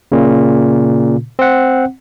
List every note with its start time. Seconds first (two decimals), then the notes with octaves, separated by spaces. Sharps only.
0.12 A#2 C#3
1.39 C4 F#5